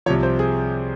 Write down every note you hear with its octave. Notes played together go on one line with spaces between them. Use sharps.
C2 C3 F3 C#5
C5
G#4